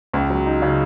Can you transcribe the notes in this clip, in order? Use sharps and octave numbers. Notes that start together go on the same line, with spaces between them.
C#2
F#3
D#4
C#3